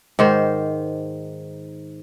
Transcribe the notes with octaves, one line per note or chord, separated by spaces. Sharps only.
G#2 D#3 C5